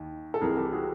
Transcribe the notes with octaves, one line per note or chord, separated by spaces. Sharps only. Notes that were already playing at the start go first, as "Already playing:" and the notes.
Already playing: D#2 D#3
A4
C2 C3 E3 G#4 A#4
G4 A4
F#4 G#4